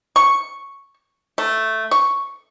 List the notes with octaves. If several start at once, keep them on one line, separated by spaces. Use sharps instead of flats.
C#6
A3
C#6